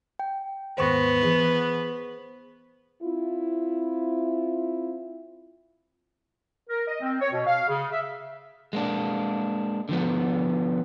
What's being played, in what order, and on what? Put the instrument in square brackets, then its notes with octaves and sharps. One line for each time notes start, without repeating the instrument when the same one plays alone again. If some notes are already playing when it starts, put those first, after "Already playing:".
[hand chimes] G5
[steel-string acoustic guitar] D#2 G#2 [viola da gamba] B3 [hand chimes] C5 C#6 A#6
[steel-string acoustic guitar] E3 G#4 D#5
[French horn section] C4 E4 F4
[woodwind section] A#4
D#5
C4
C#5
B2
F5
C#3
E5
[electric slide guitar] G#3 A#3 D4
D3 F3 B3